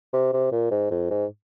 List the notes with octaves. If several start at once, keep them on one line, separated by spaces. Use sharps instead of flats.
C3
C3
A#2
G#2
F2
G#2